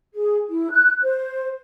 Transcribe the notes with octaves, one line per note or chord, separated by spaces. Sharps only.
G#4
E4
F#6
C5